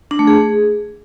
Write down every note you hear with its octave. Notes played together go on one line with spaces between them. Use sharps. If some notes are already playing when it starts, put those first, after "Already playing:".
D4
A3
G#4